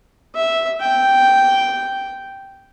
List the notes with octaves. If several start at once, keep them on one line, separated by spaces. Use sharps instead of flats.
E5
G5